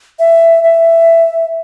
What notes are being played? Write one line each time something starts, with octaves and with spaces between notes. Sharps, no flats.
E5
E5